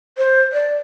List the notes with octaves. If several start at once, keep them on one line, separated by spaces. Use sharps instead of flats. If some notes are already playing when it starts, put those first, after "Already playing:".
C5
D5